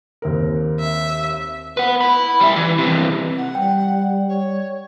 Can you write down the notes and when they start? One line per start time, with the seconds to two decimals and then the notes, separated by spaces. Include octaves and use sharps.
0.22 D#2 C4 A#4
0.80 E5
1.77 B4 F#5
2.01 E4 B5
2.40 G3 E5
2.56 E3
2.78 C3 E3
3.37 F#5
3.55 G3 G5
4.28 C#5